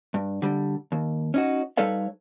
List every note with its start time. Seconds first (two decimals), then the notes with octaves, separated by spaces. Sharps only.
0.14 G2
0.42 D3 G3
0.92 D#2
1.34 C#4 D#4 F#4
1.77 G3 D#4 A4 B4 C#5 F5